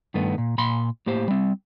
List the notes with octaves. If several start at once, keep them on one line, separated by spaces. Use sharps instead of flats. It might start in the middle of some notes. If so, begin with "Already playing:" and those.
G2 D#3 A3 B3
A#2
A#2 B5 C6
A2 A#3 G4 C5
G3 C4